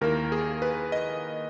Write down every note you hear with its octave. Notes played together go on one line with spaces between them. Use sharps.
D#2 D#3 A#3 E4 A#4
G#4
B4
D#5